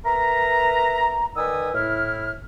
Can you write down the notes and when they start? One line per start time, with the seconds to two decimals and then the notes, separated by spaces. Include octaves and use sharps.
0.05 A#4 B4 E5 A#5
1.37 D#3 B4 D5 G#5 D#6 E6
1.74 A2 E4 F6